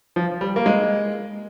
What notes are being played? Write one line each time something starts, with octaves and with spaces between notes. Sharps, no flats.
F3
G3
A#3
G#3